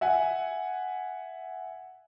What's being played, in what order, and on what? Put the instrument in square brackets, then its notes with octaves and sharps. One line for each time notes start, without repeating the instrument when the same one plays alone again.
[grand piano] E5 F#5 G#5